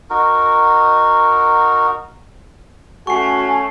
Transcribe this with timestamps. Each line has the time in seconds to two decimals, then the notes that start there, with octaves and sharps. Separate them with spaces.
0.10 D#4 F#4 A#4
3.07 A3 C#4 F#4 G#5 C#6 C7